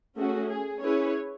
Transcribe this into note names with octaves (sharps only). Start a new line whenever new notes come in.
A3 C#4 F#4 G#4
G#4
C#4 E4 G#4 B4 C#5